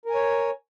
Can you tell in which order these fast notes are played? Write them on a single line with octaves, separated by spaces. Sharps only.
A#4 G#5 C#5